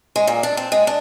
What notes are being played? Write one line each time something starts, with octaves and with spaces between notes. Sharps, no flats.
G#3
A#2
D4
C4
G#3
D4